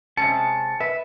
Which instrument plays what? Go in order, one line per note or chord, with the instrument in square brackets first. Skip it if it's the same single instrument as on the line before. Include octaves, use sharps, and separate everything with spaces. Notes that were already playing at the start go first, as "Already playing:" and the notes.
[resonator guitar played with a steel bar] C3 G#3 C#4 [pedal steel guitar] A5 [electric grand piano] C#7
[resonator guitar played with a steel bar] B4 [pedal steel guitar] E5